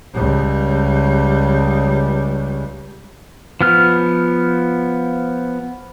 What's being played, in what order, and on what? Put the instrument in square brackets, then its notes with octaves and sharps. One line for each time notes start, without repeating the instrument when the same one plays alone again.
[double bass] C#2 G3
[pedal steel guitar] F3 B3 F6